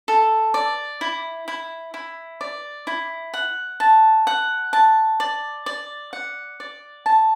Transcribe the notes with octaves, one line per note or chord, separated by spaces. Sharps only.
A4
D5
E4
E4
E4
D5
E4
F#5
A5
F#5
A5
D5
D5
F#5
D5
A5